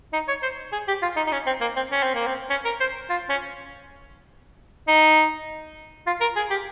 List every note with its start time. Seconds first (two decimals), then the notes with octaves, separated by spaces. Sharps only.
0.13 D#4
0.28 C#5
0.43 C5
0.73 G#4
0.88 G4
1.02 F4
1.17 D#4
1.27 D#4
1.32 C#4
1.47 C4
1.61 A#3
1.76 C4
1.91 C#4
2.03 C4
2.15 A#3
2.26 C4
2.50 C#4
2.65 A#4
2.80 C5
3.10 F4
3.30 C#4
4.88 D#4
6.07 F4
6.21 A#4
6.36 G#4
6.51 G4